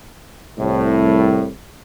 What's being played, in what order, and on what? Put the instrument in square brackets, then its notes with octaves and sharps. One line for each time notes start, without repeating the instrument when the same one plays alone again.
[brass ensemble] C2 A2